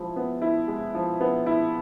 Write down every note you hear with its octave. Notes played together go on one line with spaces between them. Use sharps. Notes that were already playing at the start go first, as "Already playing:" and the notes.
Already playing: F3 G#3 E4
B3
E4
G#3
F3
B3
E4